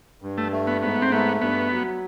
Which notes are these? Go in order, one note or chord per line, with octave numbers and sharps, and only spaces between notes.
G2
A3
A3
B3
G#2 B3
C4
A3 B3
G2 B3
F#3